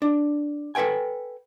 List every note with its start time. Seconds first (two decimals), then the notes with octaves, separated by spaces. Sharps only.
0.02 D4
0.75 A4 B4 C5 G5 G#5